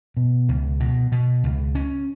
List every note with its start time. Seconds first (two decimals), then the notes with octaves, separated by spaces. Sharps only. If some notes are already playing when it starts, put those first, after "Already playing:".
0.17 B2
0.49 C#2
0.80 B2
1.12 B2
1.44 C#2
1.75 C#4